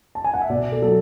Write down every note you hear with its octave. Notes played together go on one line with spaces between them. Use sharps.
A5
G#5
F#5
E5
B2 D5
A4
F#3 A4